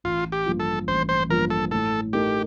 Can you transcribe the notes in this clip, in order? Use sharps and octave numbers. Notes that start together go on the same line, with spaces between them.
A1 F4
G4
G2 F3 A#3 F4
A4
A1 C5
C5
G2 F3 A#3 F4 A#4
A4
A2 A4
A3 D#4 G4 A#4